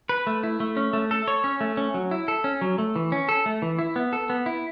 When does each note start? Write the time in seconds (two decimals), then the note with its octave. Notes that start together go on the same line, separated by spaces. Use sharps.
0.09 B4
0.27 A3
0.43 E4
0.60 A3
0.77 C#4
0.93 A3
1.11 A4
1.28 C#5
1.44 C#4
1.61 A3
1.77 C#4
1.94 F#3
2.11 E4
2.28 A4
2.44 C#4
2.61 F#3
2.78 A3
2.96 E3
3.12 C#4
3.29 A4
3.46 A3
3.62 E3
3.79 E4
3.96 B3
4.13 A4
4.30 B3
4.46 E4